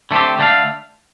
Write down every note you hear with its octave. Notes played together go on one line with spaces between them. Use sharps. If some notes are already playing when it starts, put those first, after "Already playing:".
D3 A3 C4 G4
D3 A3 D4 A4 F5